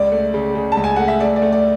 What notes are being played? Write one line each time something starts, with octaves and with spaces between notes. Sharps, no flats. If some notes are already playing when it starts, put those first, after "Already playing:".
Already playing: C#2 D5
A3
C#3
C#3
A5
C#2
G#5
A3 F#5
E5
A3 D5
D5
A3
D5